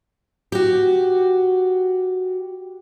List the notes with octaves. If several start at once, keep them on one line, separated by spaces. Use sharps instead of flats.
F#4 G4